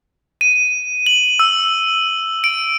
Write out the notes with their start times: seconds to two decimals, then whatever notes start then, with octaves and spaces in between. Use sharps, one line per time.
0.41 D#7
1.06 F#7
1.39 E6
2.44 D7